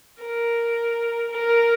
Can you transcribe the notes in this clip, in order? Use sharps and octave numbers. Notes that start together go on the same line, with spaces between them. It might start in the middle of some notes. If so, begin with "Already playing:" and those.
A#4
A#4